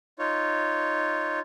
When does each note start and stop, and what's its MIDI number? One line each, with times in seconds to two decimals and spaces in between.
0.19 1.39 63
0.19 1.39 65
0.19 1.39 73